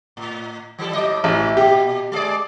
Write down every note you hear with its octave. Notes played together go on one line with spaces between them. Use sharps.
A2
E3 G3 A4
A2 F#3 D#5
A1 A#2 F#4 E5
A#2 G4
G#3 G#4 D5